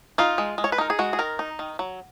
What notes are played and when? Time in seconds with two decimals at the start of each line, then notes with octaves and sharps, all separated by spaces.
0.18 D#4 F4
0.38 G#3
0.58 G#3
0.64 C#5
0.72 B4
0.78 D#4 A#4
0.90 G#4
0.99 G#3 F#4
1.13 G#4
1.19 D#3 A#4
1.39 D#4
1.59 D#3
1.79 F#3